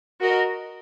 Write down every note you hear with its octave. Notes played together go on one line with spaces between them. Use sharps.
F#4 A#4 D#5